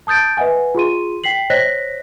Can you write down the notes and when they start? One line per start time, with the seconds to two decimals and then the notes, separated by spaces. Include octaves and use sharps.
0.07 A5 D#6 G6 A6 D7
0.37 B4 D#5 E5 F#5 G#5
0.75 F4 G#4 C6 D#7
1.24 G5 B6 C7 F#7
1.50 C5 C#5 D#5 F#6 A#6 B6